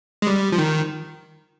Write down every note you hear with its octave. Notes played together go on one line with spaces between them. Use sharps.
G#3
G3
F3
D#3